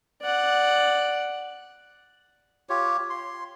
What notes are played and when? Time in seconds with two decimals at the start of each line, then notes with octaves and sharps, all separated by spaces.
0.22 D5 F#5
2.69 F4 G4 C#5
3.10 C6